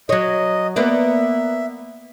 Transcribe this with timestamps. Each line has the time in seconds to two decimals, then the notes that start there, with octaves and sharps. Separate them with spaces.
0.09 F#3 C#5 D#5
0.76 A#3 B3 D5 E5